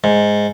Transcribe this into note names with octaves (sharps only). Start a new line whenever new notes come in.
G#2